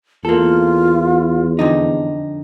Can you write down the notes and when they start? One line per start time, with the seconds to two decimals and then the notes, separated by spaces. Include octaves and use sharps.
0.25 E2 A#3 F4 A4
1.59 F2 D3 D#4